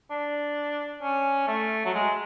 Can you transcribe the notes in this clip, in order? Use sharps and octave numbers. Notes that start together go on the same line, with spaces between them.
D4
C#4
A3
F#3
G#3